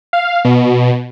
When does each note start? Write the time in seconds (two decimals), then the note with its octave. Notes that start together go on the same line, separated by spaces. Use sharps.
0.13 F5
0.45 B2